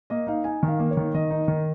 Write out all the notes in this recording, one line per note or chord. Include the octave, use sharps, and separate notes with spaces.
A#3 D#5
D#4 F5
D#4 G#5
D#3
F5
A#3
C#5
D#3
D#3 D#5
D#4
D#3